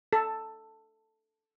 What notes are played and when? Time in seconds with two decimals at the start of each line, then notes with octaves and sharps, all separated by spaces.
0.13 A4